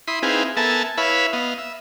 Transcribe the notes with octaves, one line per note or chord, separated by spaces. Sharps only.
E4 B5 C6 D#6
C4 D#4 E4 G#4 B4 F5
B3 A4 A#4 E5 G#5 A5
E4 B4 C#5 E5 F5 B5
B3 D#5 F5
E5